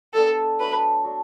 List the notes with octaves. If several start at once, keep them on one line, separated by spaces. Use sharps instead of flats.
G3 B3 D4 A4
F#3 A3 D4 B4
D4 F#4 A4